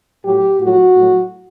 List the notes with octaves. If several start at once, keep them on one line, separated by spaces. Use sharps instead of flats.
A2 F#3 G4
A2 F#3 F#4
A2 F#3